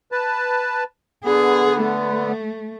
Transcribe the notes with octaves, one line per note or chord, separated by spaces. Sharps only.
B4 A5
D3 B3 G#4
A3